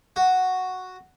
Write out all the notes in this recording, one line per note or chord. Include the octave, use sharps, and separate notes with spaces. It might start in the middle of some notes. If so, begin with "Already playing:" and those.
F#4